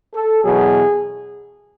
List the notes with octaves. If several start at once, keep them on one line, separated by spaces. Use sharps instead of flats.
A4
E2 B2 F#3 G#4